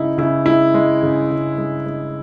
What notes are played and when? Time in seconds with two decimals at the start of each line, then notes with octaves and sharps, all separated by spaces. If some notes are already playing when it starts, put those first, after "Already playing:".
Already playing: C#3 G#3 D#4 E4
0.18 C#3 E4
0.46 G#3 E4
0.74 G#3
1.03 C#3
1.30 C#3
1.58 G#3
1.86 G#3